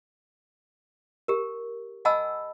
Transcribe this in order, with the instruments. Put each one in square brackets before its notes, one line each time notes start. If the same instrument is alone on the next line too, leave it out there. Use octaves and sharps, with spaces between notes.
[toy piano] G4 A#4
D#5 F#5 G#5 A5 B5 E6